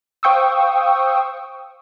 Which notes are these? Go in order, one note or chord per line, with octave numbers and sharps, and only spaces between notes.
C5 F5 G5 C#6 D#6 E6